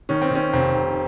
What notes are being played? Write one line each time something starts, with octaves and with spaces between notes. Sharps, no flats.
D#3 C#4
C4
D#3 C#4
F1 C4
F1